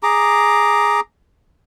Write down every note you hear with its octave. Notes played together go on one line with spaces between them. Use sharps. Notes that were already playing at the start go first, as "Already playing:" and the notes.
G#4 A#5 D6